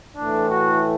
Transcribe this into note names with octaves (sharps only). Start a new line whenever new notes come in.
A2 E3 A3 D4
F#4